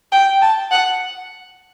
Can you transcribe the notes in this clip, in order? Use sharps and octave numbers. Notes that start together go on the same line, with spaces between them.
G5
A5
F#5